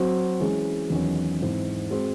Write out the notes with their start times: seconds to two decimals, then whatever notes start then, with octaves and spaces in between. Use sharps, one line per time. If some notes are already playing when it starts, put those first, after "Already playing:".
Already playing: F#3 C4 F#4 C5
0.40 E3 G#3 C#4 G#4
0.90 E2 D#3 F#3 C#4
1.40 G#2 E3 C4
1.90 G#3 C4 F#4